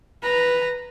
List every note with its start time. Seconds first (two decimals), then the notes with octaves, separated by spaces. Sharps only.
0.22 B4 A#5